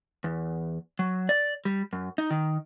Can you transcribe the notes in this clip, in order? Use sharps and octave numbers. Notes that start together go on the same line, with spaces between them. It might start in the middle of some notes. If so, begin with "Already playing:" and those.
E2
F#3
D5
G3
F#2
D#4
D#3